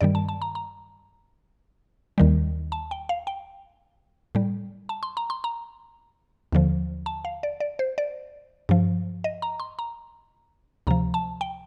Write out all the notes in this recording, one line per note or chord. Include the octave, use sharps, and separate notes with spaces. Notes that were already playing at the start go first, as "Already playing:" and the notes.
G2 D#3 G3 D5
A5
A5
A#5
A#5
D#2 D#3 G3
A5
G5
F5
G5
A2 G3
A5
C6
A#5
C6
A#5
D#2 D3 F3
A5
F5
D5
D5
C5
D5
G2 F3
D#5
A#5
C6
A#5
D2 C3 F3 A#5
A5
G5